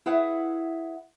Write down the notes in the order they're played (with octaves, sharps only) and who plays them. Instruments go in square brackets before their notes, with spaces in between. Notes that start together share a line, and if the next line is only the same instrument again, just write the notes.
[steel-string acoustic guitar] E4 G#4 B4 E5 F#5